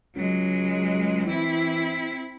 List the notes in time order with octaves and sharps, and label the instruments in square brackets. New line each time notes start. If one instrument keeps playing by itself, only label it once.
[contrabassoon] C#2 [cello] F#3 G#3
[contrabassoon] E3 [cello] C4 E4